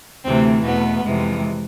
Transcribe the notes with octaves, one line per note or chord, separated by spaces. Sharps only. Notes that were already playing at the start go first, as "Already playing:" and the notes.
D2 C3 E3 A3 C4
E2 B2 A3 B3
F2 C3 E3 G#3